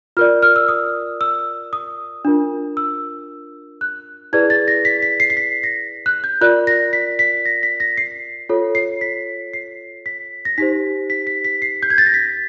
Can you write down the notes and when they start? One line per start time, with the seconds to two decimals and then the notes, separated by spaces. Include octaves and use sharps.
0.17 F4 A#4 D5 F6
0.43 F6
0.56 E6
0.68 D#6
1.21 E6
1.73 D#6
2.25 D4 F4 A#4
2.77 E6
3.81 F#6
4.33 E4 G#4 B4 D5 G#6
4.50 A6
4.68 A#6
4.85 B6
5.02 B6
5.20 C7
5.30 C7
5.37 B6
5.64 A#6
6.06 F#6
6.24 G6
6.41 F4 A#4 D5 F#6
6.67 A#6
6.93 B6
7.19 B6
7.46 A#6
7.63 B6
7.80 A#6
7.98 C7
8.49 F4 A4 C#5
8.75 C7
9.01 B6
9.53 C7
10.06 B6
10.45 A#6
10.58 D#4 G4 C5 B6
11.10 B6
11.27 B6
11.44 B6
11.62 C7
11.83 G6
11.90 G#6
11.98 A6
12.06 A#6
12.14 B6